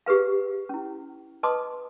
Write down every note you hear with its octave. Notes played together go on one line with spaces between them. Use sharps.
G4 G#4 B4 F5
C#4 E4
B4 D#5 A5 C6 D6 D#6